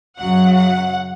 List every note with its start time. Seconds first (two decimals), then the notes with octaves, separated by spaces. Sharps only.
0.18 F#2 C#3 F#3 F#5
0.54 F#5